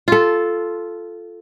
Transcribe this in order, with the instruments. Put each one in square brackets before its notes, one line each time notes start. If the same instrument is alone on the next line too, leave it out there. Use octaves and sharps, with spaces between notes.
[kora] F4 A4